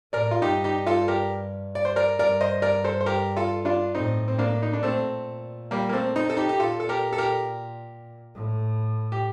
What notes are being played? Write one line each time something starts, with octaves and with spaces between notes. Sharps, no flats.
A2 A#4 D5
F4
G2 D#4 G4
D#4 G4
F4 A4
G4 A#4
D5
C5
A#4 D5
G2 A#4 D5
C5 D#5
A#4 D5
A4 C5
C5
G4 A#4
F4 A4
D4 F4
A2 C4 D#4
C4
A#3 D4
D#4
D4
A#2 A3 C4
G3 A#3
A#3
A3 C4
C4 D#4
A4
D#4 G4
G4
A#2 F4 A4
A4
G4 A#4
A4
G4 A#4
A2
G4